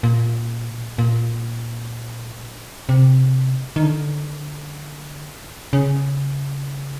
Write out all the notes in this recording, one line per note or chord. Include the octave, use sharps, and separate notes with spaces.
A#2
A#2
C3
D#3
D3
C#3